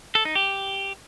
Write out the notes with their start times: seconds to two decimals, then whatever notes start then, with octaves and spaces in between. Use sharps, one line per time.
0.15 A4
0.25 D#4
0.35 G4